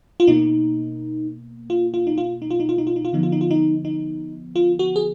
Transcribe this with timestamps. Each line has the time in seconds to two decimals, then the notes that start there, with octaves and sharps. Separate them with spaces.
0.20 F4
0.27 B2 A#3 D#4
1.70 F4
1.94 F4
2.07 D#4
2.18 F4
2.42 D#4
2.50 F4
2.60 D#4
2.69 F4
2.78 D#4
2.87 F4
2.96 D#4
3.05 F4
3.13 D3 F3 B3 D#4
3.23 F4
3.32 D#4
3.41 F4
3.51 D#4
3.85 D#4
4.56 F4
4.79 F#4
4.96 G#4